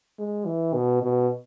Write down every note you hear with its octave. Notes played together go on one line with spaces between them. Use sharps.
G#3
E3
B2
B2